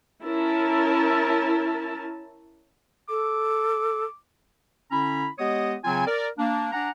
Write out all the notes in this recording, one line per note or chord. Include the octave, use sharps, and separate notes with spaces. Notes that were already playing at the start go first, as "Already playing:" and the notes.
C#4 E4 A#4 A5
A4 D6
D3 C#4 E4 A#5 B5
G#3 B3 G4 C#5 D#5 D#6
C#3 F#3 C4 F4 G#5
A#4 D5
A#3 D4
D4 F#5 G#5 A#5